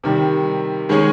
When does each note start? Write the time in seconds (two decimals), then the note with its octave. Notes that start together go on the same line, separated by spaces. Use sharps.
0.04 C3 D#3 G3
0.89 D#3 G#3 C#4 G#4 C#5